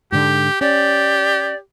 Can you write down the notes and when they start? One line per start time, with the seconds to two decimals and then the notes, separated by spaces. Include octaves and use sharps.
0.12 G#2 D3 G4
0.61 C#4 G4 D5